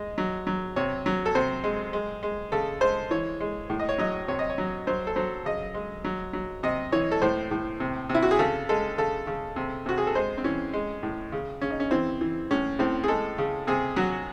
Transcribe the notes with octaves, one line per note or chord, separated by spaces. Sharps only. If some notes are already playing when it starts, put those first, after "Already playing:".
Already playing: G#3 D#5
F#3
F#3
C3 C#5
F#3
A4
C3 C5
G#3
G#3
G#3
C#3 A4
G#3 C5
E3 C#5
G#3
A2
D#5
C#5
F#3 D#5
C3 C#5
D#5
C#5
F#3
F#3 C5
A4
F#3 C5
C#3 D#5
G#3
F#3
F#3
C3 D#5
E3 C#5
A4
A2 C5
A2
C3
C3
E4
F#4
G#4
C#3 A4
G#3 A4
C#3 A4
C#3
C3
C3 F#4
G#4
A4
G#3 C5
C4
E3 C#4
G#3
A2
C#3
C#3 C#4
D#4
C#4
E3 C4
E3
A2 C#4
A2 C4
G#4
G#3 A4
C#3
C3 G#4
F#3 F#4